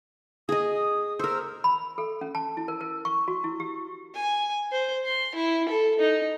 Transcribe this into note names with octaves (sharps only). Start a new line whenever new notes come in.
G#4 D#5 D#6
A#4 C5 E6
B5
A4
C#4
A5
E4
A#4
A#4
C#6
F#4
E4
G4
G#5
C5
C6
E4
A4
D#4